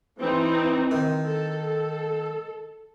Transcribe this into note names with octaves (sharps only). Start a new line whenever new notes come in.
E3 C4 D#4
D#3
A4
A4